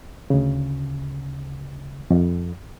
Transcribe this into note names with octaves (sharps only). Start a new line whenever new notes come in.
D2 C#3
F2